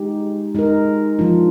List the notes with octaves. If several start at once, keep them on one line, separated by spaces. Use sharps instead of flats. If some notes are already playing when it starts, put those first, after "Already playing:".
Already playing: G#3 D#4 G4
G#3 D#4 A#4
F3 G#3 D4 F4